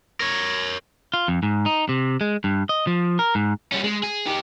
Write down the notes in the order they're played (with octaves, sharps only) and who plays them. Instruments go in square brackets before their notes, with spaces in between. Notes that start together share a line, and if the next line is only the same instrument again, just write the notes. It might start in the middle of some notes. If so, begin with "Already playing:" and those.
[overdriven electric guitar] A#4 C#5
[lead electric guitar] F4
F2
G#2
D#4
C3
G#3
G2
D#5
F3
A#4
G#2
[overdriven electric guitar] G3 C#4
G#3
G#4
D#4 G4